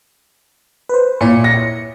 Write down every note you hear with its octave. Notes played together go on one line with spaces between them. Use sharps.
B4 C5
A#2 E4 C#5 C#7
A#6